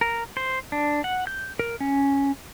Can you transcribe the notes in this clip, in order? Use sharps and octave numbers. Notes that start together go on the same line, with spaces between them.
A#4
C5
D4
F#5
G6
A#4
C#4